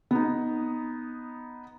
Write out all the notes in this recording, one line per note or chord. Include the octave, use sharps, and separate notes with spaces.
B3 D#4